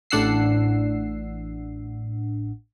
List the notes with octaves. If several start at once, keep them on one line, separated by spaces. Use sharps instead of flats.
A1 A2 D4 F#5 E6 C7